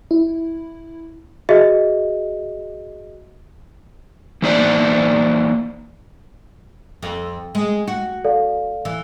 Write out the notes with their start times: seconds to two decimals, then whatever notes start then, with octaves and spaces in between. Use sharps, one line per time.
0.11 E4
1.49 F#4 G#4 D#5 E5
4.42 E3 A#3 D#4 C5 D5 E5
7.02 F2
7.55 G#3
7.88 F#4
8.24 A4 D5 F5
8.85 E3